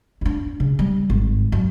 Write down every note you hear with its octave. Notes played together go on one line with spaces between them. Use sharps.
D4 E4
C#3
G3
G#1
F#2